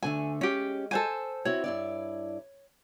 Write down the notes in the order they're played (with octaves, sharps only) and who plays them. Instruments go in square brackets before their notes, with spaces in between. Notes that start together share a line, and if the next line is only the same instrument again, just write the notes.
[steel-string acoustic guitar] D2 D3 A3 [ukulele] G#5
[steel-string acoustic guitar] G#3 [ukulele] C#4 G4
[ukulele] A4 C5 G#5
[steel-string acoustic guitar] C4 E4 F#4 [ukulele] C#5
[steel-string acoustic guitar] G2 E4 D5